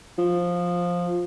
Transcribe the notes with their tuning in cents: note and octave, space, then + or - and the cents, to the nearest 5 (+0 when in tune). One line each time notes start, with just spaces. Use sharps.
F3 +10